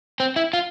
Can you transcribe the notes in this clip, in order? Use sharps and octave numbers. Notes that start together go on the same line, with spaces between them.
C4
E4
F4